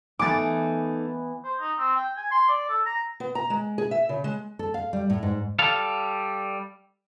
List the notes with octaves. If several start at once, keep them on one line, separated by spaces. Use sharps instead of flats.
E3 A3 B3 D#4 D6 A6
C5
D#4
C4
G5
G#5
C6
D5
A4
A#5
B3
A#5
G#3
G#4
E5
C#3
G#3
A4
F5
G3
A2
G#2
G3 A4 F5